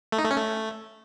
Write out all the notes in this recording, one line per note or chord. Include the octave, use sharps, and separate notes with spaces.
A3
D#4
A3
C#4
A3